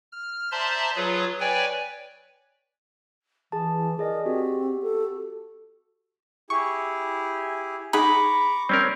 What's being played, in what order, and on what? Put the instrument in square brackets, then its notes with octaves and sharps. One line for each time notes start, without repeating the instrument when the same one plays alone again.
[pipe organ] F6
C5 D5 E5 A5 A#5 C6
F#3 F4 G#4 B4 C#5
B4 C#5 D5 G5 G#5
[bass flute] E3 [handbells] G#4 A5
[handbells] G#4 D5 D#5 [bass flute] A#4
[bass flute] C4 [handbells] F#4 G4
[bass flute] A4
[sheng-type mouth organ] E4 G4 G#4 [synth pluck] C#6
[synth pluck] D#4 G#4 F#5 [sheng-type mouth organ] A#5 C#6 D6 [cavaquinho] B5
[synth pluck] G3 [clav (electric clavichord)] C4 C#4 A#4